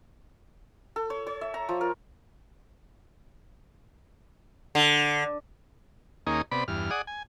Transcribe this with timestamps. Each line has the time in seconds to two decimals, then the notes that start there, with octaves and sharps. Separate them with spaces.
0.96 A4
1.10 C#5
1.27 C#5
1.41 E5
1.54 A#5
1.69 F3
1.81 A#4
4.75 D3
6.27 D#2 A#3 C#4 D#4 G#4
6.51 C3 B3 D5 B5
6.68 E2 G2 F6
6.91 G#4 D5 F#5 D#6
7.07 G#5